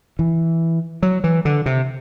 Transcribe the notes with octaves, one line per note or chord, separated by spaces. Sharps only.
E3
F#3
E3
D3
C3